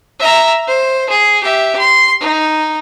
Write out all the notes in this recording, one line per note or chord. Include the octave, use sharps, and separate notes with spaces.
E5 A#5
C5
G#4
G4 E5
C6
D#4